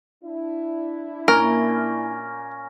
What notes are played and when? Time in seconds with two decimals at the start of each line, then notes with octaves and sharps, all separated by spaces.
0.24 D4 E4
1.28 A#2 C#4 A#4 G#5 C#6 A#6